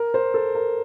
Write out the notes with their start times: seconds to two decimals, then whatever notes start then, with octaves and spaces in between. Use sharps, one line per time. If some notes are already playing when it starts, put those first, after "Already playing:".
Already playing: A#4
0.14 C5
0.34 A4
0.55 A#4